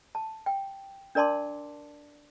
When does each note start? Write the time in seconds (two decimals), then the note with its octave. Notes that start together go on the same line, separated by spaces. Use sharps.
0.15 A5
0.46 G5
1.15 D4 A#4 D5 A5 C6 D6